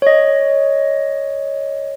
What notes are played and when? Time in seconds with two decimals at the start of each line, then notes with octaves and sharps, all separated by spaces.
0.02 C#5 D#5